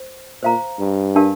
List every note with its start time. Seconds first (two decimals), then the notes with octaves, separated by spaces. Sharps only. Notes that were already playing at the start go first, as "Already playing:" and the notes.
Already playing: C5
0.43 A#2 C5 F5 A#5
0.79 G2
1.15 D4 G4 A#4 F5 A5